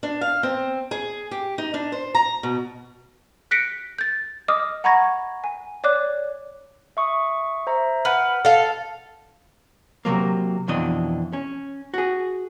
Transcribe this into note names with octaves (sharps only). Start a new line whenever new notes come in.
D4
F5
C4
G#4
G4
D#4
D4
C5
A#5
B2
F#6 A#6 B6 C#7 D7
G6 A6
D#5 D6 D#6 F6
F#5 A#5 B5 C#6 G#6 A#6
G#5
C#5 D5 D6 F#6
E5 C#6 D#6
C5 E5 A#5
B4 F#5 F6
A4 F5
C3 F3 F#3 A#3
F2 B2 E3 D4 D#5
C#4
F#4 G#4